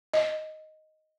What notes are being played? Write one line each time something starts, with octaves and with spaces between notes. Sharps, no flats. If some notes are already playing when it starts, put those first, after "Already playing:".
D#5